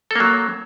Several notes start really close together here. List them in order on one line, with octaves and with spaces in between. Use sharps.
A4 A#3 F#3